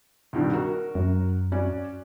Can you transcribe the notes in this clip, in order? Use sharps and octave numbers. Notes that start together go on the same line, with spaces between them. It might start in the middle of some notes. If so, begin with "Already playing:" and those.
C2 G2 D#3
F#4 A#4
F#2
C#4 F#4 D5